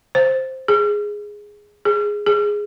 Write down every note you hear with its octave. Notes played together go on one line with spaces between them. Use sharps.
C5
G#4
G#4
G#4